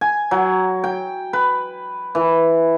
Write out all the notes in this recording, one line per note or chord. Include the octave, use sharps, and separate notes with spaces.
G#5
F#3
G5
B4
E3